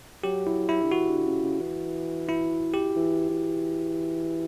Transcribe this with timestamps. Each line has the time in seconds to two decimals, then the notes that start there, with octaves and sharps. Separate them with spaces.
0.24 F#3 G4
0.47 E4
0.69 E4
0.82 D3
0.92 E3 F#4
1.09 D3
1.26 C#3
1.43 C#3
1.61 E3
2.29 E4
2.74 G4
2.96 E3
3.31 E3